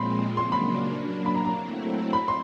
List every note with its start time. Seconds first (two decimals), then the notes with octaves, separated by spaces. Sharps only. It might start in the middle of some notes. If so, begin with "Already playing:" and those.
Already playing: A#2 F3 G#3 C4 B5 C6
0.37 C#3 F#3 A#3 D4 C6
0.52 B5
0.96 F#3 A#3 D4
1.26 B5
1.35 A#5
1.45 A#5
1.54 F#3 A3 C4 E4
2.13 B5
2.28 C6